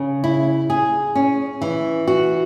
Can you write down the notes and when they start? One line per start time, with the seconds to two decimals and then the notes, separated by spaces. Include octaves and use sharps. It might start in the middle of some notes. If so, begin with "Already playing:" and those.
Already playing: C#3
0.24 E4
0.70 G#4
1.15 C#4
1.61 E3
2.07 F#4